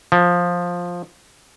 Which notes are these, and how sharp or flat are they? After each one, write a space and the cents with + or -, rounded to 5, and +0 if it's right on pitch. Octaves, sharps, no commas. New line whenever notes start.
F3 +10